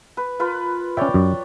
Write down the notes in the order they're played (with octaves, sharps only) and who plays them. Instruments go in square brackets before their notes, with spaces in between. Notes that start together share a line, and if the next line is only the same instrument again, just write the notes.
[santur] B4
F4 A#4 B4
[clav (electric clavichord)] C#4 E5 [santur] C#5 D5 G5
[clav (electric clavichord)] F#2